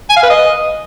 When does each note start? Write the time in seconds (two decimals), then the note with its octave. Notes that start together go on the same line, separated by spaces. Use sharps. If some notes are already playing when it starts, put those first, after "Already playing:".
0.10 G#5
0.16 F5
0.23 B4
0.30 D#5